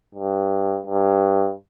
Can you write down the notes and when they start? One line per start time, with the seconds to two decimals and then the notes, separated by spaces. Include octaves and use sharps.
0.15 G2
0.87 G2